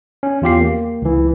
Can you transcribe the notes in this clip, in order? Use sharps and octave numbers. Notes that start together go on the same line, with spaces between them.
C#4
E2 F4 G4 C7
A#3
C#2 E3